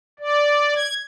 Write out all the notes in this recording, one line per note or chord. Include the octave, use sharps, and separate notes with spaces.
D5
G#6